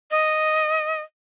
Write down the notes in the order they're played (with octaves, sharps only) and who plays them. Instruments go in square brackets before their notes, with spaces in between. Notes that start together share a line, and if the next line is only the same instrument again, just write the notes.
[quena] D#5